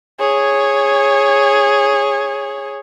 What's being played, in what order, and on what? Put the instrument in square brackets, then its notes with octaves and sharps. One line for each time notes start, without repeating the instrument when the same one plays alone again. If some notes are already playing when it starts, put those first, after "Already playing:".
[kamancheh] G#4 C#5